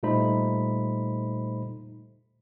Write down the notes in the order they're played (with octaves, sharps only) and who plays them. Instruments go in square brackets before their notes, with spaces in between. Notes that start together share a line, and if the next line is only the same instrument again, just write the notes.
[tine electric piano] A#2 G3 A3 D#4 C5 B5